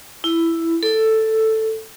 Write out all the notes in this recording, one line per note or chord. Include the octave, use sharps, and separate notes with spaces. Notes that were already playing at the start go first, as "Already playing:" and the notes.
E4
A4